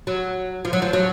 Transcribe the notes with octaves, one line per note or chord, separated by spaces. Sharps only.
F#3
F3
F#3
F3
F#3